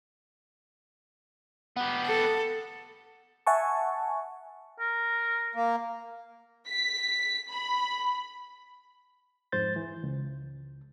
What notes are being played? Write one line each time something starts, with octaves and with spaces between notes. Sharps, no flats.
B3 G4 F#5
A4
E5 F#5 G#5 A5 C#6
A#4
A#3
B6
B5
F2 G#2 C5 G6 A6
E3
C#2